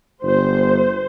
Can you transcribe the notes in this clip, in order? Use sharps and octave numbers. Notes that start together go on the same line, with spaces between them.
G1 C5